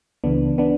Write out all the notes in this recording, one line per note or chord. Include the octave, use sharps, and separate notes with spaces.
C#2 C#3 E3 B3 D4
B3 D4